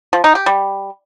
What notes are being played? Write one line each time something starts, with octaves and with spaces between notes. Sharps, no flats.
F3
D#4
G4
G3